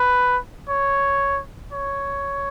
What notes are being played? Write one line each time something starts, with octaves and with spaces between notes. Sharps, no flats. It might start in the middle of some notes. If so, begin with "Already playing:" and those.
Already playing: B4
C#5
C#5